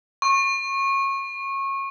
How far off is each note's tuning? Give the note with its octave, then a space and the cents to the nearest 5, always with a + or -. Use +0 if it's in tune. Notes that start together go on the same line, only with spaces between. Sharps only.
C#6 -25